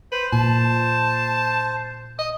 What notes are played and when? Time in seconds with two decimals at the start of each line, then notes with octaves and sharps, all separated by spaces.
0.12 B4 C5
0.33 A#2 A5
2.19 D#5 D#6